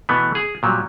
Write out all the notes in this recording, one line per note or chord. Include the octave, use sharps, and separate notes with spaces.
B2 E3 A3 B3
G#4
A#2 F#3 G3